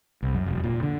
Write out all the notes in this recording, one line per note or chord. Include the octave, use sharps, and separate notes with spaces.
C2
F#2
E1
A#2
D3